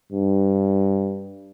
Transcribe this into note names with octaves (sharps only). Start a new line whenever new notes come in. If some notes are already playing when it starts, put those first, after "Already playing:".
G2